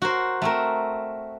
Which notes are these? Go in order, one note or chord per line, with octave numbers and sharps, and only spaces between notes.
F#4 A#4 C5
A3 C4 A#4